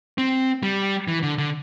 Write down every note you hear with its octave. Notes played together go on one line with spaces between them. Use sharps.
C4
G3
E3
D3
D3